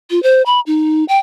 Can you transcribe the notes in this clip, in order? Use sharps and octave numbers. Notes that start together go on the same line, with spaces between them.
F4
C5
B5
D#4
G5